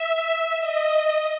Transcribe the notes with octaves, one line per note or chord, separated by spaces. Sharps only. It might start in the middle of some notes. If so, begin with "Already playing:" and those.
Already playing: E5
D#5